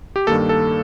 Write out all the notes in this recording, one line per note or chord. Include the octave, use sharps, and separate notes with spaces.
G4
G2 D#3 A#3 A4
A4